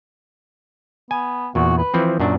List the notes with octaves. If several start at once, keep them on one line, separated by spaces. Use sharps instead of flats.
B3 G#5
E2 A#2 F#4
B4
E3 F3 C4
F#2 A#2 F#3 D4